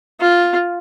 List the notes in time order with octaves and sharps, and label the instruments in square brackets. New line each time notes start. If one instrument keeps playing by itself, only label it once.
[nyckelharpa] F4